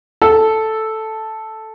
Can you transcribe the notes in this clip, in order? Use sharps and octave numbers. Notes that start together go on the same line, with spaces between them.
A4